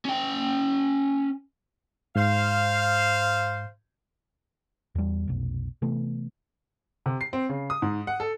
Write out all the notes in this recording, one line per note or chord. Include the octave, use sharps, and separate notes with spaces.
C#4 G5
G#2 C5 F5
E2 G3
F1 B1
C3 E3 A3 B3
C3
C7
C4
C#3
D#6
G#2
F#5
A4